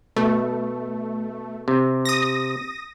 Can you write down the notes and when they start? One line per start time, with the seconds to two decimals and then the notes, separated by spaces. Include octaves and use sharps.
0.16 B2 A3
1.68 C3
2.05 D#6 A#6